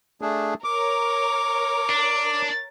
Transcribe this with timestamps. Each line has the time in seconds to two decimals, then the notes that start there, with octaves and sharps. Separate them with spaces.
0.21 A3 D4 G#4
0.64 A#4 C#5 D6
1.90 D4